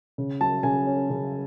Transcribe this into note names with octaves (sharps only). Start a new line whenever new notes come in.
C#3
F#3 A5
C#3 G#5
C#4
C#3